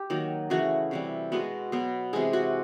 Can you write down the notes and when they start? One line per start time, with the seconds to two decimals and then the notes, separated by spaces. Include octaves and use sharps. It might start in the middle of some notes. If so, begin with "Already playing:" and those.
Already playing: G4
0.10 D#3 F#3 A#3
0.50 C#3 E3 A3 F#4
0.91 C3 E3 G3
1.32 B2 G#3 B3 F#4
1.72 B2 F#3 B3
2.13 C3 E3 G#3 G#4
2.33 F#4